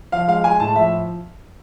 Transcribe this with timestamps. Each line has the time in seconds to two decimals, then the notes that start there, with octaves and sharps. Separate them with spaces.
0.12 F3 F5
0.28 G#3 F5
0.44 G#3 G#5
0.60 A2 A5
0.76 F3 E5